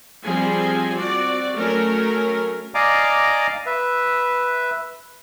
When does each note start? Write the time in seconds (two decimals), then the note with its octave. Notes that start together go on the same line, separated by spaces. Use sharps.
0.24 F3 G3 C4 G#4 G#5
0.97 C4 F#4 D5
1.55 F#3 A3 C#4 A#4
2.74 D5 D#5 F5 G#5 A#5 D6
3.66 B4 E5